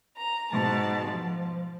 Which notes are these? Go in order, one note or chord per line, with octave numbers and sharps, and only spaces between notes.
A#5
G#2 B2 A5 A6
F3